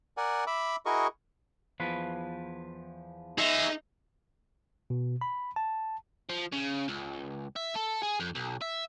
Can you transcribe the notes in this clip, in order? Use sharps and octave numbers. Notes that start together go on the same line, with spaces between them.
A#4 D5 F#5 G#5
E5 B5 D6 E6
E4 F#4 G#4 A#4 D#5 C#6
E2 F3 B4
D#4 G#4 E5
B2
B5
A5
F3
C#3
C#2
E5
A4
G#4
F2
B1
E5